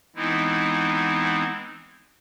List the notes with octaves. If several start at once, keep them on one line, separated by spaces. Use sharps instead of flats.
E3 G#3 B3 C4 D#4 E4